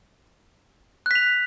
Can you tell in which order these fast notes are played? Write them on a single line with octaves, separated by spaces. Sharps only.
F#6 B6 F7